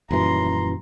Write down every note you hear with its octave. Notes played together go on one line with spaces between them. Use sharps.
D#1 F#2 E3 A#5 C6